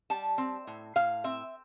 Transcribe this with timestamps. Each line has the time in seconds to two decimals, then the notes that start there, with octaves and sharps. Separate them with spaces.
0.10 G3 A5
0.38 C4
0.67 A2
0.96 A2 F5
1.24 C4 E5